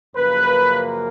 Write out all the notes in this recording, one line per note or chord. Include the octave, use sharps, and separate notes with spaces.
F#2 C#3 F3 A#3 B4
A#4